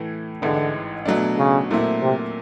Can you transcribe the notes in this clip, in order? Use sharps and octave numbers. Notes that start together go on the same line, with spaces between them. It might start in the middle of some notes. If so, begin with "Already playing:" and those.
Already playing: A2 E3 A3
A1 G#2 D3 E3 G#3
B2 F#3 A3 D4
C#3
A#2 F#3 A3 C4 E4
C3